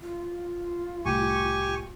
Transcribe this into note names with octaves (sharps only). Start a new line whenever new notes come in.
F4
C2 A2 G4 G#5 C#6